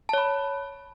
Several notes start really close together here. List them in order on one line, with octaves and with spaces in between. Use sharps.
A5 C#5 B5